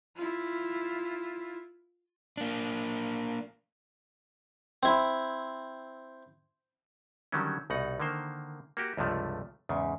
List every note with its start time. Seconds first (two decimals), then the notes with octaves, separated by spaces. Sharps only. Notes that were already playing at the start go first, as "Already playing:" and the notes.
0.16 E4 F4
2.37 A#3 D4
4.83 C4 E4
7.32 D3 D#3 F#3 G3 C#4
7.70 C2 B2 D#4 F#5
8.00 D3 D#3 A#3 C5
8.77 A#3 F#4 G4
8.97 C#2 G2 C3 F3 A3
9.69 E2 G#2 C#3